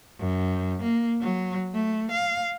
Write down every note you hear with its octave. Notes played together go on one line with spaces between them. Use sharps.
F#2
A#3
F#3
A3
F5